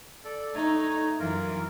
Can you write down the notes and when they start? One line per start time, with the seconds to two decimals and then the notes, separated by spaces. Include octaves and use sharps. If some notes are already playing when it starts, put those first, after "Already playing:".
0.25 A4 D5
0.55 A3 D#4 C#5 A#5
1.19 F#2 E3 F4 A#4